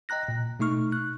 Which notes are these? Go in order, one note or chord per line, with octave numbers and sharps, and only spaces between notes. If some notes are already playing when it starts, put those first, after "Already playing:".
D#5 G5 A#5 F#6 A#6
A#2
B2 A3 D#4 C#6 F6
F#6